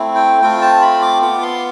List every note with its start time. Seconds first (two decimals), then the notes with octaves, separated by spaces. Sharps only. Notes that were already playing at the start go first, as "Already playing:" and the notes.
Already playing: A3 C4 E4
0.15 G5
0.41 A3 C4 F4 G5
0.62 A5
0.82 B5
1.02 D6
1.22 B3 F4 D6
1.42 C6